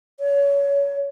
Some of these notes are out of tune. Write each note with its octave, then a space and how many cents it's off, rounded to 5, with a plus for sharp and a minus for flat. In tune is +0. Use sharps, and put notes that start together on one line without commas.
C#5 +25